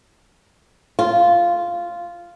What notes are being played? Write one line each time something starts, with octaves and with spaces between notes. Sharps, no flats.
F4